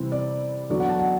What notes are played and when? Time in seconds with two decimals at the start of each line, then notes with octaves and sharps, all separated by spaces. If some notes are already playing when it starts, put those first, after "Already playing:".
Already playing: C3 E3 G3 C4
0.12 D5
0.69 E2 D3 F#3 B3 D5
0.80 F#5
0.89 A5
0.99 F#5